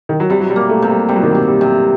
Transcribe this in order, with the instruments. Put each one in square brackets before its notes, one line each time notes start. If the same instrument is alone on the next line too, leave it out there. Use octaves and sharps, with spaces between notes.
[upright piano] D#3
F#3
[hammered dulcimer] C3 [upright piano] G3
[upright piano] F#3
G3
[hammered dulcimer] A#3
[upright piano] A3
[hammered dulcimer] C3
[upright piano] G3
[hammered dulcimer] C3 [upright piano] G3
[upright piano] F#3
D#3
F#3
[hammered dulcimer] C3
[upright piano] G3
[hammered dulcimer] C3